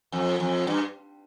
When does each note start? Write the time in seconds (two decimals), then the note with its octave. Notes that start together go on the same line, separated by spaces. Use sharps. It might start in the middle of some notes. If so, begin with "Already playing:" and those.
0.12 F2
0.40 F2
0.67 G2